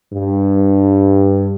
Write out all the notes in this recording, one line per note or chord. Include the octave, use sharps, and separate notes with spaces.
G2